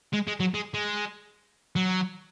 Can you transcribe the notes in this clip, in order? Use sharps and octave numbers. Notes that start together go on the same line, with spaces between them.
G#3
G#3
F#3
G#3
G#3
F#3